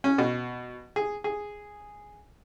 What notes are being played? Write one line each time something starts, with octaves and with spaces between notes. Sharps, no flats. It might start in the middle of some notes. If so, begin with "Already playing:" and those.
C#4
B2
G#4
G#4